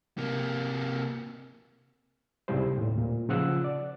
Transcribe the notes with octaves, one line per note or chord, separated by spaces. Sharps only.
C3 A#3
C#2 G#2 C3 G3 E4 C5
D#2 A2
A#2
C#3 F3 F#5 E6 F#6
D5